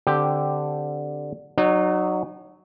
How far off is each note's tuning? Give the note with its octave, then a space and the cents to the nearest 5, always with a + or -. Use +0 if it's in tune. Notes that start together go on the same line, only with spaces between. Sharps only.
D3 +0 C4 -15 G4 +0
F#3 +0 D#4 -35